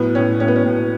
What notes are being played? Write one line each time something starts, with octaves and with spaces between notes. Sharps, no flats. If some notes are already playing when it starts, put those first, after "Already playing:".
Already playing: A2 F#3 B3
A2 C#4
A2 C#4
B3
C#4
A2